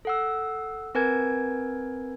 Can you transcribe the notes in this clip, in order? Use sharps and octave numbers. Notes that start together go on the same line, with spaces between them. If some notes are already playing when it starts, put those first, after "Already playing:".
A4 F#5 E6
C4 A#4 B4 G#5 G#6